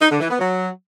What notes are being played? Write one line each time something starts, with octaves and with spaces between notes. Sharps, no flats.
D#4
D3
E3
B3
F#3